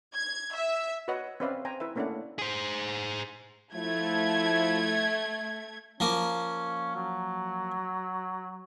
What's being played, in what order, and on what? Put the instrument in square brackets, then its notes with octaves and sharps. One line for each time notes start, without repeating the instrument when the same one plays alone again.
[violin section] G#6
E5
[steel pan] F#4 B4 C#5 D#5 F#5
C4 C#4 B4 D5 E5 F5
C5 G5 G#5 A#5
E4 B4 E5
A3 A#3 C#4 D4 E4 F#5
[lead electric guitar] G#4 C5
[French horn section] F3 E4 [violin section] A3 G#6
[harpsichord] F3 A#3 [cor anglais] C#4
[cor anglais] F#3